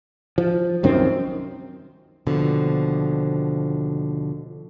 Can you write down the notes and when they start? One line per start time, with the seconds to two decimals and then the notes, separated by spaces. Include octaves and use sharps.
0.38 F3
0.83 C2 F#2 D#3 C4
2.27 D#2 B2 D3 F3